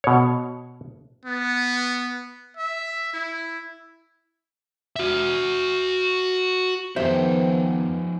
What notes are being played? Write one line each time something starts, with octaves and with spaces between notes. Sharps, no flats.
B2 C#5
B3
E5
E4
F#4 E5
F2 D#3 F3 B3 D#4 G4 C5 E5